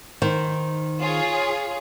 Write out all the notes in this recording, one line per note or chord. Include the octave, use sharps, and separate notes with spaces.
D#3 C5
F4 G#4 C#5